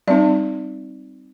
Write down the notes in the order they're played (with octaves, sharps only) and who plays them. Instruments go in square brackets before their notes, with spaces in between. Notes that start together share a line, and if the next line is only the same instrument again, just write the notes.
[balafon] G3 C4 D#4 D5